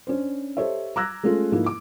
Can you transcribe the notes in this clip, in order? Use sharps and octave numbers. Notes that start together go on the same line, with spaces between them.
C#4 D4 C5
G4 A4 C5 C#5 D#5 E5
A#5 D6 E6 F#6 G#6 A#6
G#3 A3 C#4 F4 A4
G#2 F3 A#3 D#4 E4
D6